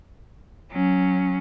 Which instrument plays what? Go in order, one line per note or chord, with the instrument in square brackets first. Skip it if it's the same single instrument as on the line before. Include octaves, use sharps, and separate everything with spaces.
[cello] F#3 C#4